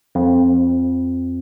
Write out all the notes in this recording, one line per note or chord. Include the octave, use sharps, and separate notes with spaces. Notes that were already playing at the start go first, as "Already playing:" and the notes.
F2